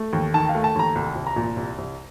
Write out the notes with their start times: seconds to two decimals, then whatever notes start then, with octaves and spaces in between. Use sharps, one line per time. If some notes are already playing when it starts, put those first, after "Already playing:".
Already playing: A3
0.13 D#2
0.34 D#3 A5
0.49 F5
0.55 A3
0.64 A5
0.75 D#2 A#5
0.95 C2
1.15 C2
1.27 A#5
1.36 A#2
1.57 C2
1.78 C2